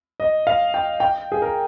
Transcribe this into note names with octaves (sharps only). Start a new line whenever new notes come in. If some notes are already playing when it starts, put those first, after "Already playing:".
D#5
F5
G5
G5
G#4
A#4